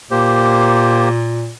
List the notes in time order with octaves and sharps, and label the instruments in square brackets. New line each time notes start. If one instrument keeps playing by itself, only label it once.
[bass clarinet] A#2 [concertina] A#3 G4 C5